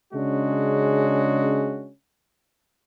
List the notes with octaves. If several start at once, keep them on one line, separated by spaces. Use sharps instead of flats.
C#3 G#3 C#4 D4 F#4